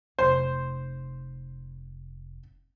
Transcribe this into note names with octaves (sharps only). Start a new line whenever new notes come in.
F1 C5